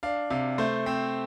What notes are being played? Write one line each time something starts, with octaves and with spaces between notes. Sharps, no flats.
D4 F5
C3 F5
A3 C5
C4